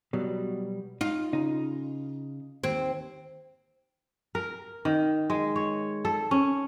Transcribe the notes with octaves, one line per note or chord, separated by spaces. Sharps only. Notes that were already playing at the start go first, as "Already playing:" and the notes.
B2 F#3 G3
D#4 F4
C#3 D#4
D#2 C4
A#4
D#3
G#3
C#5
A4
C#4